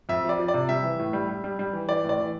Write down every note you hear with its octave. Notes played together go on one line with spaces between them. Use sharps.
F2 E5
F3
D5
F3
D5
C3
G3 E5
E3
A2
G3
G3
G3
G3
E3
E3 D5
A2
D5
E3